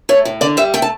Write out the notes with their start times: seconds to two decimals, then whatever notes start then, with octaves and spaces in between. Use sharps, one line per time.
0.09 A3 C#5
0.25 A2
0.41 D3 D5
0.57 G3 E5
0.74 A3 G5
0.82 A5